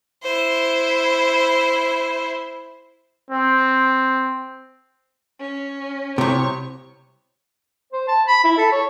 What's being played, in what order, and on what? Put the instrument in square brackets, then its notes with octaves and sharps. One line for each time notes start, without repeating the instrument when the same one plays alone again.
[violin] E4 C5
[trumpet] C4
[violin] C#4
[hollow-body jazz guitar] C2 C3 [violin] C#5 C#6
[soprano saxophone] C5
A5
B5
E4
A4
C#5